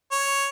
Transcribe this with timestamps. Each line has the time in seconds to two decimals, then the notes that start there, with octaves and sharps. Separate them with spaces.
0.12 C#5